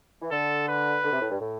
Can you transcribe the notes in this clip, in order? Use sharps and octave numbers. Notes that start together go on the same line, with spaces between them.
E3
D3 A4
B4
D3
C3
A2
G2
A2